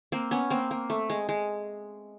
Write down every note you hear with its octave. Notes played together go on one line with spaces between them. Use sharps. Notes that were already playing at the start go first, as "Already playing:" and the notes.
A#3 C4
B3 C#4
A#3 C4
A#3
A3
G#3
G#3